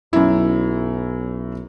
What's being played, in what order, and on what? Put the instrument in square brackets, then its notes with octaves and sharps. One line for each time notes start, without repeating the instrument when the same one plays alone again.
[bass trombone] B1 [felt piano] F#2 E4